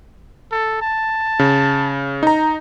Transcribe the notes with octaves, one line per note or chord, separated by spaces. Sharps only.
A4
A5
C#3
D#4 A#5